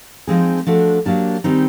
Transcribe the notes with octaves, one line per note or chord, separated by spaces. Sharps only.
F3 G#3 C4 D#4 G#4
F3 A3 D4 F#4
F#3 A#3 D4 G4
D#3 G3 C4 D#4 G#4